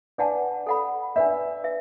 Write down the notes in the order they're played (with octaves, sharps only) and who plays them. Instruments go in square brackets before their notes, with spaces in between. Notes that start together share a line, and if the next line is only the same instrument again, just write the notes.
[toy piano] D4 B4 F#5 A5 [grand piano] D5
[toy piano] A4 F#5 B5
[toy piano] D4 B4 D5 [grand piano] E5
[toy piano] B4 E5